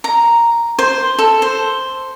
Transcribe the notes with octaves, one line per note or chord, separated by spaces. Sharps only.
A#5
C5
A4
C5